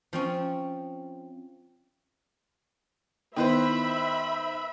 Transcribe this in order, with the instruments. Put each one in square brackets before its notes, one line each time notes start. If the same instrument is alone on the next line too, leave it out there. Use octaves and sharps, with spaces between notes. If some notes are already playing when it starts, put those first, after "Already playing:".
[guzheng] F3 C4 C#4
[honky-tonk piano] D#3 B4 C5 [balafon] B3 E4 [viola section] E5 B5